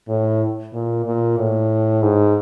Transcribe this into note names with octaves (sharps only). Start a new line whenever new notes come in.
A2
A#2
A#2
A2
G#2